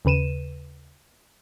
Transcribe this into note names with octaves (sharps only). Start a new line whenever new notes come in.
D#2 C#3 B4 D#7 E7